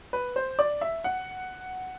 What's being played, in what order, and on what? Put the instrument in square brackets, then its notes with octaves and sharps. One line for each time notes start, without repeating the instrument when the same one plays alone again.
[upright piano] B4
C5
D5
E5
F#5